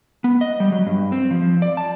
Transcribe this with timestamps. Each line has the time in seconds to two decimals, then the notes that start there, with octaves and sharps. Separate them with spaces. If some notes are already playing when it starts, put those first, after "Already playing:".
0.24 B3
0.41 D#5
0.60 G3
0.72 F#3
0.86 G2
1.12 C4
1.31 F3
1.62 D5
1.77 A5